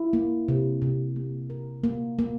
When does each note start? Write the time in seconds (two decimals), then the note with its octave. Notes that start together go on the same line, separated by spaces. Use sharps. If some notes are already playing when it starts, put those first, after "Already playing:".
Already playing: E4
0.13 A#3
0.48 C3
0.82 C3
1.16 A#3
1.50 A#4
1.84 A#3
2.19 A#3